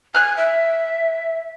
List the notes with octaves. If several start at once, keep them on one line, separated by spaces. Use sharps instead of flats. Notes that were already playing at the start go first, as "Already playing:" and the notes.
G#5 F6 F#6
E5